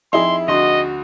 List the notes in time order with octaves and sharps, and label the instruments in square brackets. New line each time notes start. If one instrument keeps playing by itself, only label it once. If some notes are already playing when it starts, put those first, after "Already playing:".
[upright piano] F2 D#4 G#4 [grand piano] E4 [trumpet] C6
[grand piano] D2 C6 [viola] F#4 [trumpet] D#5